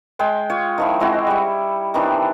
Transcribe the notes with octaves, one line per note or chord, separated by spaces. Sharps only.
G#3 G5 C6
F4 C#5
D#3 F3 E4
G#3 C4 E4 F#4
G3 C#6
D#3 E3 C4 D4